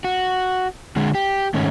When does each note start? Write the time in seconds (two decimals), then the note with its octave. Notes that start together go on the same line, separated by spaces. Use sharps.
0.04 F#4
0.96 D3 G#3
1.15 G4
1.54 G#2 D#3 A3 C#4